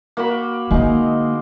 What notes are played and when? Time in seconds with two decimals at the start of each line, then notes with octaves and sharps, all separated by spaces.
0.17 A#3 F#4 B5
0.71 D3 G#3 A#3 D#4 D#5